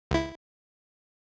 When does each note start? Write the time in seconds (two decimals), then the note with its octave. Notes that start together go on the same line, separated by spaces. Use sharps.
0.11 C#2 E4